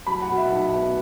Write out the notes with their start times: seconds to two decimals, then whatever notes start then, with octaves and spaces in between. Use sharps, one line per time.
0.07 F#3 B5
0.22 F#5
0.29 B2
0.37 E5
0.52 B1
0.74 B3